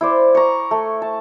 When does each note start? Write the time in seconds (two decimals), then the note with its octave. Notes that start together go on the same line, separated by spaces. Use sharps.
0.01 E4 C5 D5
0.35 A#5 C#6
0.71 A3
1.02 A5